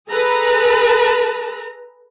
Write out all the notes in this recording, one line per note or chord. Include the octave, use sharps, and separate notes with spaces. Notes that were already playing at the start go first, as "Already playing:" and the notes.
G#4 A4 B4 A#5